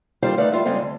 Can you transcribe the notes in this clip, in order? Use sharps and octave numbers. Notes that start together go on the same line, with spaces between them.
D#3 G3 F4 G4 C5
D2 A3 D#4 B4 D5 F5
G3 F4 E5
G2 C#3 G3 G#3 C4 F4
D2